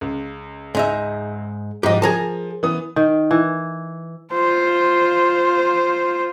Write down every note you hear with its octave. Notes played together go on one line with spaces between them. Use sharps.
C#2
G#2 D#4 E5
G#2 F3 G4 D#5
F3 G#4 A#4 A5
E3 B3 D#6
D#3
E3
F4 C5